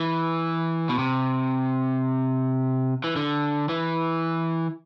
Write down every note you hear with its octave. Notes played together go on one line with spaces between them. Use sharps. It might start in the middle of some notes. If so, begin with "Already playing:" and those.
Already playing: E3
B2
C3
E3
D3
E3